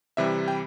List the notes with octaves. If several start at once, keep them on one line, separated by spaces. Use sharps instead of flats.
C3 E3 G3 E5
G5